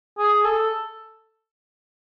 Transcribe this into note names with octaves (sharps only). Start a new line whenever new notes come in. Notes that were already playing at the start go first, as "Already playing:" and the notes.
G#4
A4